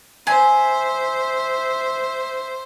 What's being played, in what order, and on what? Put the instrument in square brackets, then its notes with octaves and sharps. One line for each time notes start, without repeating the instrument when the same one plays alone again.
[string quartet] C5 [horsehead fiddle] E5 [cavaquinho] G#5